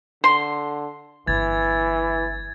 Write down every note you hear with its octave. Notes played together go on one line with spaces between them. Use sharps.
D3 C6
G1 E3 G#6 A6